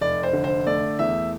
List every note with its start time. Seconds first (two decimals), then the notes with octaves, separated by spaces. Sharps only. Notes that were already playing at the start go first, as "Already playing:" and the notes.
0.01 F1 D5
0.23 C5
0.33 D3
0.44 C5
0.66 A3 D5
0.99 E2 E5